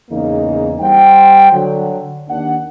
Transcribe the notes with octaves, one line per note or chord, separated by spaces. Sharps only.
E2 G#2 C#3 A#3 D#4
G3 C5 F#5 G5
D3 F#3
D#2 D4 F#5